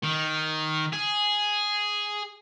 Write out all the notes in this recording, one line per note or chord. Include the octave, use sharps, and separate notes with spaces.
D#3
G#4